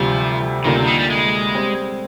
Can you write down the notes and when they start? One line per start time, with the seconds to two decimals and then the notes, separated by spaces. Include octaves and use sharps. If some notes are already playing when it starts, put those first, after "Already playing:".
Already playing: D2 C3 F3 G3
0.64 D2 D3 D#3 G3 A#3 F4
0.76 C3
0.87 D#3
0.99 G3
1.10 G#3
1.54 G3 C4